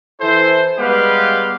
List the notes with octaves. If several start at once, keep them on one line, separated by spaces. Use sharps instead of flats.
E3 E4 A4 C5
G3 G#3 B3 G4 B4 F5